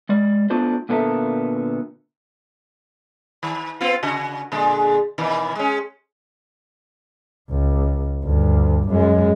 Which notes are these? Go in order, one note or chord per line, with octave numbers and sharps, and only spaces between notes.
G#3 D5
A3 B3 D4 F4 C5 D5
A#2 D3 B3 A4 A#4 E5
D#3
B3 C4 F4
C#3 F#4
A#2 D3 G#3
B2 D#3 E3
G#3 C#4
C#2
D2 G2
F#2 G#3